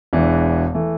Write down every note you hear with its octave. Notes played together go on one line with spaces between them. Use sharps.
E1 E2 E3 D4
E3 A3